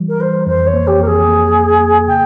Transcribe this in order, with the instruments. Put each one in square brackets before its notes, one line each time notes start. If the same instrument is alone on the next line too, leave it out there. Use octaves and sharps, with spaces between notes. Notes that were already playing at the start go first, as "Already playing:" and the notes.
Already playing: [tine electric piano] E3 G3
[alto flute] A#4
[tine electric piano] E3 [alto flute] C5
[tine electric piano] F2 [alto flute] C5
[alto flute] C#5
[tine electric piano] A#3
[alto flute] G4
[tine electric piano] F2 [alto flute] A#4
[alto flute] G#4
[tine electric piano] A#3
A#3
A#3
[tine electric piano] C#3 [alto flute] G5